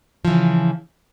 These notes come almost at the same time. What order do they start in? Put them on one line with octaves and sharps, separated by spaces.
F3 E3 C#3